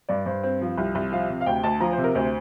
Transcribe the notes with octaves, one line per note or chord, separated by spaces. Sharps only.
G2 D5
G2 C5
C4
F3
C2
C2
F3 F5
C3
F5
D2 G5
D2 A5
F3 A#5
C3 C5
A#4
D2 C5